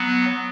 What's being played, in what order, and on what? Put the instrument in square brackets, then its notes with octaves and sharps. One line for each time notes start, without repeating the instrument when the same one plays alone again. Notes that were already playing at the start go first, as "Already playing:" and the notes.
Already playing: [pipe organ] F#3 B3